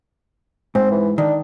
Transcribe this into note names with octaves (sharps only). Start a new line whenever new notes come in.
G#2 C4
E3
D#3 D4